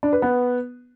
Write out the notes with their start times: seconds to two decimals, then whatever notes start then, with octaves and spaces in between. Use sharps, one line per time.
0.03 D4
0.13 B4
0.22 B3